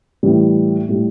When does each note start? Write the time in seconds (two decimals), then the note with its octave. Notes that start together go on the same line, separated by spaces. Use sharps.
0.23 A2 E3 G3
0.89 A2 G3